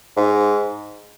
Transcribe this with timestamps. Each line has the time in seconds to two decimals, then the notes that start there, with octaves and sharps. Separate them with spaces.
0.17 G#2